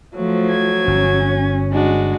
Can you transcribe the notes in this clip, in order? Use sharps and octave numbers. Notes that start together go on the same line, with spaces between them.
F3 F#3 A3
G#6
G1 C#4
G#3 D4 F#4